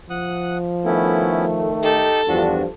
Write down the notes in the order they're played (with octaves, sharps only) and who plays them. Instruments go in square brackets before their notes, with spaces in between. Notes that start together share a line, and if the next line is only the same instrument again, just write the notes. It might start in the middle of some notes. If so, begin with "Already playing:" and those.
[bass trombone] F3 [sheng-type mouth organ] F#5 D#6 F#6
[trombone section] D#3 A3 [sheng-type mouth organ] B3 C#4 E4
[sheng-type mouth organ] D#4 G4 [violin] A4
[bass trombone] E2 [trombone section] G2 F3 [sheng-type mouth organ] D4 F#4